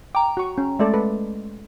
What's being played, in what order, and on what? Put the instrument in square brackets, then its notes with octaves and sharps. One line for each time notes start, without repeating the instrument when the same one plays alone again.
[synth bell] G5 A#5 [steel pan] D6
[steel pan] F#4 C#6
C#4
[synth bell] G#3 A3 [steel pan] A4 D5 E5
[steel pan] A4 B4